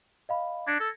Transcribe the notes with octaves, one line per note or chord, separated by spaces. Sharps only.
D#5 F5 B5
D4 G#6 A#6 C#7
A4